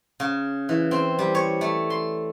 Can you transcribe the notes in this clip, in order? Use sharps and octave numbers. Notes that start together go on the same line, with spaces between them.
C#3
E3
C4
G3
C#5
A3
C6